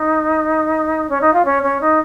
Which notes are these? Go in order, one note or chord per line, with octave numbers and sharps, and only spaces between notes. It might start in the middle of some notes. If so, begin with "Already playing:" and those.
Already playing: D#4
C#4
D#4
F4
C#4
C#4
D#4